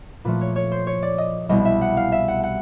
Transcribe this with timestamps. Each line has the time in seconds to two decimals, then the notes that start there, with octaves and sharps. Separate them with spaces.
0.25 A#2 F3 A3 B4
0.41 C#5
0.56 C#5
0.72 C5
0.87 C#5
1.03 D5
1.18 D#5
1.49 C2 B2 G3 B3 E4 D#5
1.65 E5
1.81 F#5
1.97 F5
2.12 E5
2.28 F#5
2.43 F#5